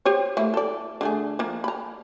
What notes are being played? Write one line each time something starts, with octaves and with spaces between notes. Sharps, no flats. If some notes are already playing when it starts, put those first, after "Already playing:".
G4 C5 C#5
A3 A#3 E4
A4 D5
D3 A3 G#4
F3 A#3
A#5 B5